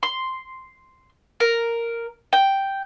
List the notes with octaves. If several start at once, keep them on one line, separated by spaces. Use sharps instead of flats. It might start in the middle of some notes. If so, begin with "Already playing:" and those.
C6
A#4
G5